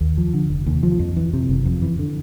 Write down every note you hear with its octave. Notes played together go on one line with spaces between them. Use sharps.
D#2
F3
D3
F1
D#2
F3
F2
E3
C3
F#1
F2
E3
D3